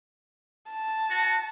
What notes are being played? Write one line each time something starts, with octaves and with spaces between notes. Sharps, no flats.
A5
F#4